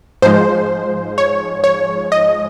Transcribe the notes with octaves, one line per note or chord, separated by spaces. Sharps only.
G#2 F3 G#3 C5
C#5
C#5
D#5